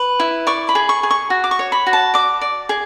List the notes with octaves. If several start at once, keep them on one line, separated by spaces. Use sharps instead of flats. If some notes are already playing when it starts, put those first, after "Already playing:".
Already playing: B4
E4
D5 C#6
B5
G#4
C#6
G#4
C#6
F#4
D6
C#6
C#5
B5
F#4
A5
D5 D6
D5
G#4